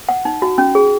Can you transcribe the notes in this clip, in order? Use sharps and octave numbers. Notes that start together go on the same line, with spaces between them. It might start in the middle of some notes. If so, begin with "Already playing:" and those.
F#5
D#4
F#4
C#4
G#4